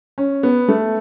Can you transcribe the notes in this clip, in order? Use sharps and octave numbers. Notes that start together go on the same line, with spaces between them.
C#4
B3
A3